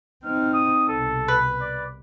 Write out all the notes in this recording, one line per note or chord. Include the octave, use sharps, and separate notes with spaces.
C4 D#4 F6
D#6
C2 B2 A4
B4
D5